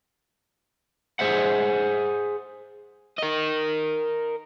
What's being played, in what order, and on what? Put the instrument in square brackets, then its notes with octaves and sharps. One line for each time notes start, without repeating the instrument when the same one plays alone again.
[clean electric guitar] G#4 C5 E5 F#5
[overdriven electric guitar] A#4 D#5